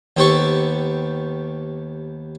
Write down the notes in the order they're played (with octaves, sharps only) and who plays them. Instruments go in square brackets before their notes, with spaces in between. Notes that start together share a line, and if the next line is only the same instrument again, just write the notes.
[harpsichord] D#2 B3 G4 A4 C5 C#6